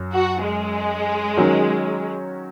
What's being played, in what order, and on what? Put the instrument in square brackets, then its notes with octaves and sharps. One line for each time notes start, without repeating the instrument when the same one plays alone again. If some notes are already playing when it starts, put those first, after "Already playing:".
Already playing: [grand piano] F#2 F#3
[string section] F#4
G#3
[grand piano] D#3 F#3 C#4 F#4 A#4